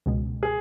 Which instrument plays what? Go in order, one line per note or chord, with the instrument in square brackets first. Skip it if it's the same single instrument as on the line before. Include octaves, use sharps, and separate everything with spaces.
[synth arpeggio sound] C#2 B2 G#3
[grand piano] G#4